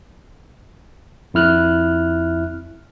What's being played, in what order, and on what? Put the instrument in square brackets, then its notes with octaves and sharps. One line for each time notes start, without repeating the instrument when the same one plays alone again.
[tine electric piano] F2 E4 F6 F#6